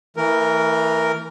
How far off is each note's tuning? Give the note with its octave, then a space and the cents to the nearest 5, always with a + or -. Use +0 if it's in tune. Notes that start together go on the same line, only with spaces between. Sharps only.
E3 -15 A3 +40 A#4 +0